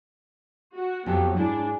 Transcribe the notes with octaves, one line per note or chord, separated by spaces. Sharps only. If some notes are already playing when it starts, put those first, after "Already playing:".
F#4
F2 F3 F#3 B3 G4 A4
G#2 D4 E4 G#4